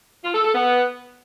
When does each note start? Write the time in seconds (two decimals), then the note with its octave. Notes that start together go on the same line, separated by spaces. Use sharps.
0.24 F4
0.34 A4
0.44 A4
0.54 B3